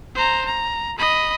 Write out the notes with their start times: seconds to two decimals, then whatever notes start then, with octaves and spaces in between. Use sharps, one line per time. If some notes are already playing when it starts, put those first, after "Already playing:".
0.15 C5 A#5
0.46 A#5
0.98 D#5 B5